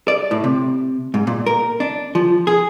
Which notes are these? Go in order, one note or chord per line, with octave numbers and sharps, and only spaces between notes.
D5
A2
C3
G#2
A#2
A#4
D4
F3
G#4